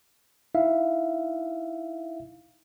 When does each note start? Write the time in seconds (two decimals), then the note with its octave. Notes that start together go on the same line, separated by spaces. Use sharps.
0.55 D#4 E4 E5 F5